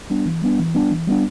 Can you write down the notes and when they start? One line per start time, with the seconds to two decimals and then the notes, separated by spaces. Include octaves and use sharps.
0.10 G3 B3 D4
0.26 E3
0.42 G3 B3 D4
0.59 E3
0.75 G3 B3 D4
0.91 E3
1.07 G3 B3 D4